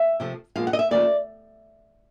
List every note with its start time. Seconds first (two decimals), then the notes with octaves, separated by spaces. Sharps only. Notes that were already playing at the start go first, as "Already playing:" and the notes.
Already playing: E5
0.20 C3 F3 A3
0.56 A#2 F3 G#3 B3 F5
0.67 F#5
0.73 D#5
0.79 E5
0.91 D#2 C#3 F3 A3 D5